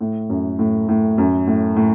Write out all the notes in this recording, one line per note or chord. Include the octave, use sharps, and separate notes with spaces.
A2
F#2
A2
A2
F#2
A2
A2